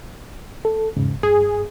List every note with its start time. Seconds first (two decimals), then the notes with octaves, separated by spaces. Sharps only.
0.65 A4
0.97 E2 G#2 C#3
1.23 G2 G#4